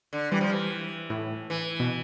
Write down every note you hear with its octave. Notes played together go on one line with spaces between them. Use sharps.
D3
E3 G3
F3
E3
A2
E3
B2